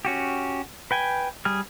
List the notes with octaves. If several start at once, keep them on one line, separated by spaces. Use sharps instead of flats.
C#4 F#4 G4
B4 G5 G#5
G3 G#4 F6